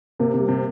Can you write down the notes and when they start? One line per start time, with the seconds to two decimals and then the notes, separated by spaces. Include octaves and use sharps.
0.19 C3 A#3
0.34 C3
0.39 G3
0.48 C3